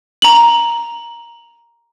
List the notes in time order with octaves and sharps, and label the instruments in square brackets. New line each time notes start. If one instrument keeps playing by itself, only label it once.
[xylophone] A#5 F#7